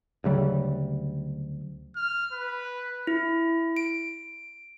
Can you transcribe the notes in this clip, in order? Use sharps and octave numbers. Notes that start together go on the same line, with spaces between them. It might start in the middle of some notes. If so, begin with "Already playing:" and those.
D2 C#3 F#3 G3
F6
B4
E4
D7